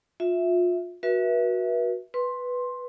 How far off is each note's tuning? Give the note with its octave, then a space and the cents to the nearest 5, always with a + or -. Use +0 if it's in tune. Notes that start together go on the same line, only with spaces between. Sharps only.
F4 +30 E5 +0
F#4 -5 B4 -40 E5 +0
B4 +0 C6 +10